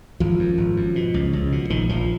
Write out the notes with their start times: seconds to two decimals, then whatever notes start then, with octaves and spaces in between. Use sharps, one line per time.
0.20 G#1 F3
0.39 F#2
0.58 G#1
0.77 F#2
0.96 B2
1.14 C#2
1.33 C#2
1.52 B2
1.70 A#1 D#3
1.89 A#1 F3